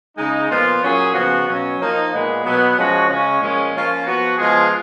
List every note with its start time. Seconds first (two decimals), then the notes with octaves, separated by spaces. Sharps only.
0.17 C#3 G#3 D#4
0.50 A#2 F3 B3 F4
0.82 A#2 F#3 C#4 G#4
1.14 C#3 F3 B3 F#4
1.47 B2 F#3 C#4
1.79 F3 A#3 D#4
2.11 A#2 G#3 B3
2.44 B2 F#3 B3
2.76 F3 G#3 C#4 F#4
3.08 C#3 G#3 C#4
3.41 A#2 F3 G#3 C#4
3.73 F3 A#3 C#4 F4
4.05 F3 B3 F#4
4.37 F3 G#3 B3 F4 G#4